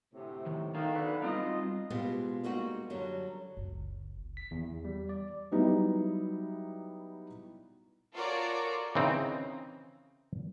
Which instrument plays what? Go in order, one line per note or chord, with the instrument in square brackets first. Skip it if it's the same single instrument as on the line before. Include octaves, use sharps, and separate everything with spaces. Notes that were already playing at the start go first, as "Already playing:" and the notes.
[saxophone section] D2 A2 C3
[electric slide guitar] D#3
[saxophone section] D#3 [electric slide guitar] D#4 A4 F5
[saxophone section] B2 D3 B4
[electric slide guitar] G3 C4 D#4 [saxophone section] F4 D#5
[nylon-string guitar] B2 G#3 B3 C4 F4 G4
G3 G#3 A#3 C4 D#4 F#4
F#2 D3 F#3 G3
[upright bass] F#1 C#2
[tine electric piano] B6
E2
G3
D5
[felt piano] F#3 G3 B3 D#4 E4
[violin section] F4 F#4 A4 A#4 C#5 D5
[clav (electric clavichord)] C#3 E3 C4 D#4